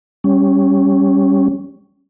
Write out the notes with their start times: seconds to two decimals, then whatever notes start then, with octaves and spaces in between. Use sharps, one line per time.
0.24 G3 C#4